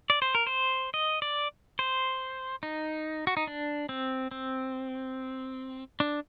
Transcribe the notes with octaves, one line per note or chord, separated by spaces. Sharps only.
D5
C5
A#4
C5
D#5
D5
C5
D#4
F#4
D#4
D4
C4
C4
D4